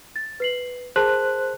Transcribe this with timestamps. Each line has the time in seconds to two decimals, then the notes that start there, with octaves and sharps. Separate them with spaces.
0.16 A6
0.40 B4 C7 F#7
0.96 G#4 A#4 C5 A5 F#6